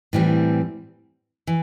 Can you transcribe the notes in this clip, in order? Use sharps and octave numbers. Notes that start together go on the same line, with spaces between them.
A2 E3 G3 C4
E3